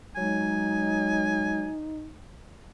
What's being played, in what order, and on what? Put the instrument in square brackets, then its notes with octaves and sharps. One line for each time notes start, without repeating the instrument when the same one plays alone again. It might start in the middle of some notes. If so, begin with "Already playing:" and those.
[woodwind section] F#3 G#3 [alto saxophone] D#4 [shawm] G#5